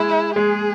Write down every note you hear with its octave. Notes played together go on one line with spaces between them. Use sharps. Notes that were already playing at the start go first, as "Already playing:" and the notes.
Already playing: G#3 E4
G#3 G#4